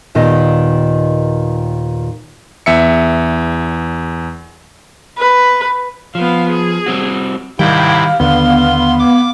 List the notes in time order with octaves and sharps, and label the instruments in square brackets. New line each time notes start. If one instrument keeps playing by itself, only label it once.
[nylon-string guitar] D#2 A#2 D#3 B3 D#5
[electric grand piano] E2 E5 C#7
[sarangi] B4
[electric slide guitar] F3 [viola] B3 F5
[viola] G#4
[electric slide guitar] G3 C4 F#4
[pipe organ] G#2 C3 E4 [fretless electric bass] D#3 G3 [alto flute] F5 [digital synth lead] G5
[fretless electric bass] D#2 D3 [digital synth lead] B3 [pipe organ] C6
[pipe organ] D6